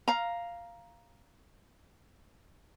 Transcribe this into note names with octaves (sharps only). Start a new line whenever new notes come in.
F5 A#5